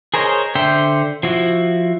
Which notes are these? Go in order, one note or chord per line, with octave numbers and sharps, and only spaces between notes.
G#4 A#4 C5 C#5 D#5
D3 C5 E5 G5
F3 E4 F#4